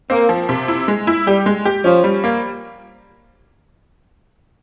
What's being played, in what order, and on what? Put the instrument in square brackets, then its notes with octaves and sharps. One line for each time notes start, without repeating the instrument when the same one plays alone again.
[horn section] A#3 [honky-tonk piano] C4
[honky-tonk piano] F3
C3
E4
G#3
E4
[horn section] G3 [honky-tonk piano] G4
[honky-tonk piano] G#3
G4
[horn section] F3 [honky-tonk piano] C#4
[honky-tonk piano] G3
A#3